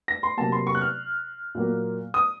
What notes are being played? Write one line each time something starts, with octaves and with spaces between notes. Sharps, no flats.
A#6
C6
C3 F#3 A#3 A5
C6
C#6
F#6
F6
A#2 F#3 A#3
D#6